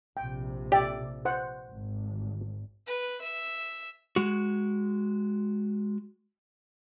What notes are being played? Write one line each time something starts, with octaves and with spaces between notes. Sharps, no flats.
A#1 C3 G5
G4 D5 E5
C5 F#5
G#1
B4
E5
G#3 F#4